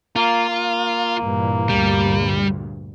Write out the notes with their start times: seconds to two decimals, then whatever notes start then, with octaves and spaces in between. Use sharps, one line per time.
0.16 A#3 F4
0.50 A#3
1.20 G2 A#2 E3
1.69 D2 G2 A#2 G3